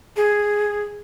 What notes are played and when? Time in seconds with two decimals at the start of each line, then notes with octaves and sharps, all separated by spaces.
0.16 G#4